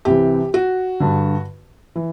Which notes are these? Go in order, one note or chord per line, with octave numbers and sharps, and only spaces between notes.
C2 C3 E3 G4
F#4
G2 D3
E3